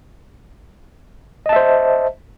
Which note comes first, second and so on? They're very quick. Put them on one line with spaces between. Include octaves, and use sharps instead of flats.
D#5 A5 E5 C5